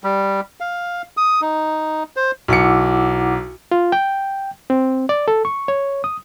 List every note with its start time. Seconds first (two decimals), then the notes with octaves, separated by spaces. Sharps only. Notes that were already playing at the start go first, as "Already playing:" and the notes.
0.04 G3
0.60 F5
1.17 D#6
1.42 D#4
2.16 C5
2.48 B1 E4 F#5 D6 C#7
3.71 F4
3.92 G5
4.70 C4
5.09 D5
5.28 A4
5.45 C#6
5.68 C#5
6.04 D#6